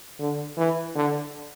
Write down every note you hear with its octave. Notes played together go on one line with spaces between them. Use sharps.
D3
E3
D3